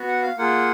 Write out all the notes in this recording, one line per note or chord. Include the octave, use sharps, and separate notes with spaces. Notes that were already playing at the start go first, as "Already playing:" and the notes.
Already playing: B3 F#4
F#5
F5
A#3 F4 G#4 F#5